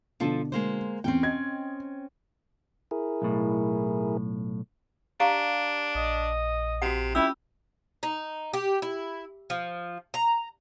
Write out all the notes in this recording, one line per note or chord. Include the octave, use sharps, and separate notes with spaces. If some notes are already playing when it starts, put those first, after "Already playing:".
B2 D3 F3 D4 F4 A4
G#3 A#3 C5
E2 C4 C#4 G5
D#5 G#6
E4 G#4 A#4
B1 A2
D4 G4 F5 A#5
A#1 D#5
C3 F#4 F#5
C#4 E4 F4 G4 E6
D#4
G4
E4
F3
A#5